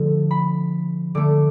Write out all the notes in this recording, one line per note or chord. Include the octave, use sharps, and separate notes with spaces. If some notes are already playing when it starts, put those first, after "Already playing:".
Already playing: D3 F3 A3
B5
D3 A3 D6